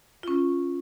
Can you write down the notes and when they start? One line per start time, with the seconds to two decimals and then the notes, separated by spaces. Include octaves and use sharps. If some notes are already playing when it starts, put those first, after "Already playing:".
0.23 C#4 F4